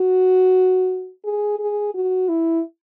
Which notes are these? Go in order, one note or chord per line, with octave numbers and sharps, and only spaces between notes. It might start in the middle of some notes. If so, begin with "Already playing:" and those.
Already playing: F#4
G#4
G#4
F#4
E4